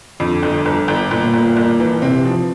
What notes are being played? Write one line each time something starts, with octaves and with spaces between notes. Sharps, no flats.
F2 D3
G1
G1
G1
G1 A#2
G1
G1
E3
C3 C4
F3